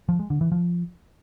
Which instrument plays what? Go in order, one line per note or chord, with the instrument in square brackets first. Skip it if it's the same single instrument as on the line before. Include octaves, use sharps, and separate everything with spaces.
[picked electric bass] F3
G#3
D3
E3
F3